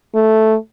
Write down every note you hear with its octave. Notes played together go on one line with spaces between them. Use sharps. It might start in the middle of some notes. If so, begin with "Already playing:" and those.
A3